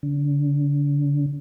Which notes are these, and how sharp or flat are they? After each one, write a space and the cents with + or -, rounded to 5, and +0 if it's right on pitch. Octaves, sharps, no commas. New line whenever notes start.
D3 -35